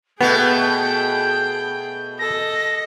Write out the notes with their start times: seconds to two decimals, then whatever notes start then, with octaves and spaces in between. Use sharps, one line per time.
0.21 B2 A3 B3 G#4 G5 G6
2.19 A4 D#5 A#6